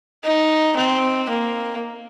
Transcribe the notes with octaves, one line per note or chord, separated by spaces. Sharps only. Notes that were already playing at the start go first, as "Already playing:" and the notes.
D#4
C4
A#3